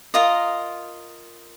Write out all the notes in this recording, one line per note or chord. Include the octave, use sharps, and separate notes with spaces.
F4 A#4 D#5 A#5